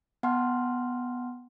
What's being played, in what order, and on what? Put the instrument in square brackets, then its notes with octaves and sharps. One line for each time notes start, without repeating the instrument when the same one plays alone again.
[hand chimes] B3 F#5 G5 A5 C6 F6